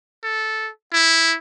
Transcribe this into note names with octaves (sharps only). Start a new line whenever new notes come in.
A4
E4